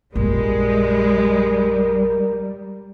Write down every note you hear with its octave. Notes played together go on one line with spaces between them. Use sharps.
A#1 F#2 G3 G#3 A#4